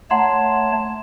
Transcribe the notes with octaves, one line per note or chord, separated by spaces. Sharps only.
A3 C#5 F#5 A5 A#5 C6